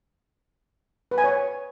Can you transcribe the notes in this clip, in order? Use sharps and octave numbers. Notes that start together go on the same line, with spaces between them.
B4
G#5
C#5